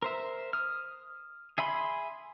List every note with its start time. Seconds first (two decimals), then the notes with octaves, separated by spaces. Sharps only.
0.02 A#4 C5 E5
0.53 D#6 F6
1.58 G#4 E5 G#5 B5 C6